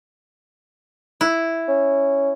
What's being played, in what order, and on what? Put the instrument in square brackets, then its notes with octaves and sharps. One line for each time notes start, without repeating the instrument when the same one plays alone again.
[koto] E4
[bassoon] C#4